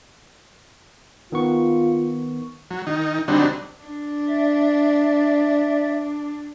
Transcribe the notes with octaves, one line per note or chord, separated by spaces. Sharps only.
D#3 B3 F4 C#6
F#3
D#3 D#4
D3 F#3 G3 C4 D4 D#4
D4
D5 E5